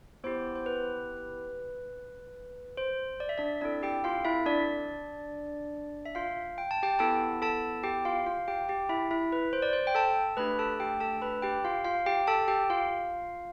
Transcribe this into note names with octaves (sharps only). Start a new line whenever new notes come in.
B3 E4 G4 C5
C5
B4
C5
D5
E5
D4 D5
C4 D4 E4 A4 D5
G4 G5
F4 F5
E4 E5
D4 D5
E5
F4 F5
G5
A5
G4 G5
B3 E4 A4 A5
A4 A5
G4 G5
F4 F5
F4 F5
G4 G5
G4 G5
E4 E5
E4 E5
B4
C5
D5
C5
G5
A4 A5
A3 D4 G4 B4 B5
A4 A5
G4 G5
A4 A5
B4 B5
G4 G5
F4 F5
F4 F5
G4 G5
A4 A5
G4 G5
F4 F5